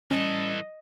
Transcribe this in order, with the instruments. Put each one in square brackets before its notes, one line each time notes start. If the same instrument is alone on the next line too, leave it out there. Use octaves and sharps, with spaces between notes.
[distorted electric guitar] E3 A4 [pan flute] G3 [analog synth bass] C#4 [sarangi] D#5